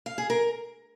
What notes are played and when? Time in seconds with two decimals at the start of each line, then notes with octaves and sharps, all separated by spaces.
0.06 F5
0.18 G#4
0.30 A#4